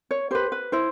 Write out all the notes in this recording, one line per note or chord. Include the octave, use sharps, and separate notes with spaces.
C#5
G4 B4 C5
B4
E4 C5